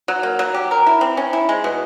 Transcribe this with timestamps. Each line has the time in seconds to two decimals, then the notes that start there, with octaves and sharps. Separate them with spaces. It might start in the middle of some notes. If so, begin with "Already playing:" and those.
0.08 F#3
0.23 A#3
0.39 F#3
0.54 G4
0.71 A#4
0.87 E4
1.01 C4
1.17 C#4
1.33 E4
1.49 G#3
1.64 B2